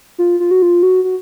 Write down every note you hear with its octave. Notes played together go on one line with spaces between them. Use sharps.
F4
F4
F#4
F4
F#4
F#4